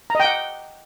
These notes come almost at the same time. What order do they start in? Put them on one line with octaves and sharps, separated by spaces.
A#5 D#5 G5 F#5